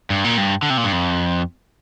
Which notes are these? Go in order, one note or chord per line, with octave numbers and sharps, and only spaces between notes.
G2
A#2
G2
D3
C3
A#2
G2
F2